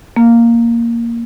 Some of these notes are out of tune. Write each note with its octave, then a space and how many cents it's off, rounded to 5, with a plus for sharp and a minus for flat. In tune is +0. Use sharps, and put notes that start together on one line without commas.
A#3 +0